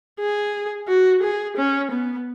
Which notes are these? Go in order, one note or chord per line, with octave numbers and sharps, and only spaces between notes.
G#4
F#4
G#4
C#4
B3